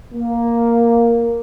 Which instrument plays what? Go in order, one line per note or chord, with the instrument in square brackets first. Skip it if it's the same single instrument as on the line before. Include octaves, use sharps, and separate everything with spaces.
[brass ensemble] A#3